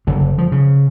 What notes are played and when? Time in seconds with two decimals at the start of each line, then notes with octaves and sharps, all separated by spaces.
0.07 F#1 D3
0.38 F3
0.52 C#3